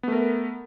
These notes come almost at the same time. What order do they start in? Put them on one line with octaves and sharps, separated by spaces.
B3 A3 A#4